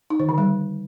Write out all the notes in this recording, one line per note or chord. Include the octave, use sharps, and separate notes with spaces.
D#4
D#3
D3
G3